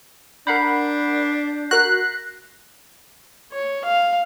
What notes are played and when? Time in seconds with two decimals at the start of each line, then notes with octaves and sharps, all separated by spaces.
0.47 D4 A#4 F#5 B5 G6 B6 C7
1.71 F#4 A#4 F#6 A#6
3.52 C#5
3.84 F5